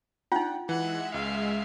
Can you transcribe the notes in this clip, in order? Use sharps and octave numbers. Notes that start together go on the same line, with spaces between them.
D4 D#4 F4 F#5 G5
E3 G#3 E5 F#5
C#2 F5